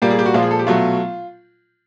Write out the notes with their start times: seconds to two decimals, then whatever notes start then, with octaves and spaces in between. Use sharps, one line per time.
0.02 A#2 G3 A#3 G4
0.11 G#4
0.19 G4
0.26 F#4
0.34 A#2 F3 G#3 F4
0.42 G#4
0.51 A4
0.59 G4
0.67 B2 F#3 A3 F4